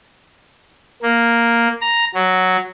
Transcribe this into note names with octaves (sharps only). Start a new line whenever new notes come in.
A#3
A#5
F#3